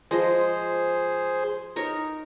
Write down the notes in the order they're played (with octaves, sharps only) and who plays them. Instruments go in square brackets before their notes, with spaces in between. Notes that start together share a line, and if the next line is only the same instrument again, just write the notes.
[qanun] F3 G#3 D#5 [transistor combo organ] G#4 C5
[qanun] D#4 A#4 C#5